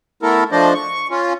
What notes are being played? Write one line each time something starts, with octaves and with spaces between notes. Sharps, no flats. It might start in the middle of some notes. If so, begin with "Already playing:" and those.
A3 B3 E4 A4 A#4
F3 A3 D4 C5 D5 D#5
C#6
C#4 F4